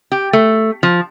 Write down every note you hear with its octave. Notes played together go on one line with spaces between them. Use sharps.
G4
A3
F3